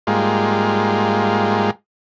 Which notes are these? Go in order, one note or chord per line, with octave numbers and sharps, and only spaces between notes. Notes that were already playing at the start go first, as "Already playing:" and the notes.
G#2 G3 G#3 A#3 F4